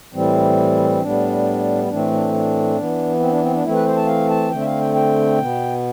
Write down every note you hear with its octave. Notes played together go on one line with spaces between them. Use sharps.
A2 E3 G3 C4
A2 G3 B3 D4
A2 E3 A3 C4 D4
D4
D4
E3 B3
C4
D4
C4
D4
E3 A3 C4 E4
B4
C5
A5
F5
A5
D3 A3 C4 G5
E5
F5
G5
G5
B2 B3